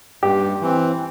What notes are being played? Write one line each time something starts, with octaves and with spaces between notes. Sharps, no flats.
G2 G4
E3 C4